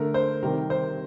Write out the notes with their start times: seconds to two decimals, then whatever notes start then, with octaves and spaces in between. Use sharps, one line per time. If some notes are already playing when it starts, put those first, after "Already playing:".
Already playing: D3 A3 A#4
0.14 C5
0.43 C3 D#3 G3 A#4
0.70 C5